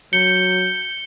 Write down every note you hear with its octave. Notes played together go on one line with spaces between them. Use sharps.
F#3 G6 C#7 G7